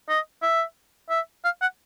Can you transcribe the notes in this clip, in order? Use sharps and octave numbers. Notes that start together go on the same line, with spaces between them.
D#5
E5
E5
F5
F#5